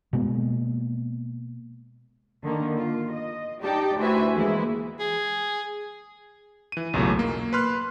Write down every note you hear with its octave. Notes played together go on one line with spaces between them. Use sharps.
B2 G#3 A#3 B3
D3 D#3 A#3
F4
D#5
D#4 G4 D5 G5 A5
D2 E3 F#4 C5 E5 G#5
E3 G#3 A#3 E4
G#4
E3 D#7
B1 E2 A#2 C#3 F#3 A3
A#3
B4 B5 C6 F6 F#6